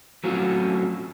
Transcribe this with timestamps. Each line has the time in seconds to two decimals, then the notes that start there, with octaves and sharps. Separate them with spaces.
0.24 F#3 A3 C4 C#4 F4 F#4